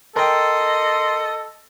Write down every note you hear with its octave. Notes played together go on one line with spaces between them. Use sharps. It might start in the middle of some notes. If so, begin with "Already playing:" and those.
A4 A#4 D#5 G5 C6